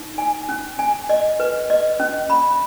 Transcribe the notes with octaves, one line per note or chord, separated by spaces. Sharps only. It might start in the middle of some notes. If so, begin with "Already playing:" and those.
Already playing: D#4
G#5
C#4
G#5
D#5
B4
D#5
C#4
B5